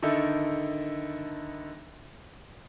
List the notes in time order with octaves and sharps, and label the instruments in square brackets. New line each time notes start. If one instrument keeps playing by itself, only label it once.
[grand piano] D3 D#3 D#4 E4 A4